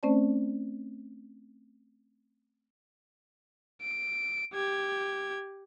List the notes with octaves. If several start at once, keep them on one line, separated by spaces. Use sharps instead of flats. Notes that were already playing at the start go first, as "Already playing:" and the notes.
A3 C4 C#4 C5 D5 A5
D7
G4 G#6